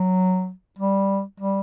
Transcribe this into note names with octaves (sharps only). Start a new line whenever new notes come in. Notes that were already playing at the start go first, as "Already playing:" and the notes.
Already playing: F#3
G3
G3